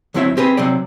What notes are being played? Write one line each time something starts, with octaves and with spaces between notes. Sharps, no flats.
D#2 F#3 C4 E4 C#5 E5
C4 G4 G#4 B4
C3 F#3 C4 D5